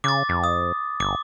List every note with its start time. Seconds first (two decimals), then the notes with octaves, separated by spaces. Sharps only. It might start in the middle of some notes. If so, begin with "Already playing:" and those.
0.04 C#3 D6 A6
0.29 F2
0.44 D#6
1.00 G1 D6